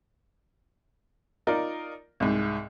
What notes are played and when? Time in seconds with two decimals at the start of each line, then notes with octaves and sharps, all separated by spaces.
1.47 D#4 F4 A#4 D5
2.20 C2 G#2